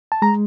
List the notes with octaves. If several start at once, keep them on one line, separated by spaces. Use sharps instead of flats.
A5
G#3 A#5